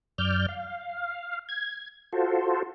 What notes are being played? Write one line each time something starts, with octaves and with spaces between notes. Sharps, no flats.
F#2 D5 F6 G6
F5
G#6
F4 F#4 A4 C5